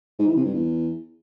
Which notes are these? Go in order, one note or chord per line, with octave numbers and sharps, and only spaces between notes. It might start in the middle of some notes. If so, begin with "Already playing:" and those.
G#2
E3
C3
G2
E2